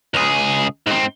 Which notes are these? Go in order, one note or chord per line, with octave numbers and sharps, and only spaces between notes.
C#2 G#4
G#2 C4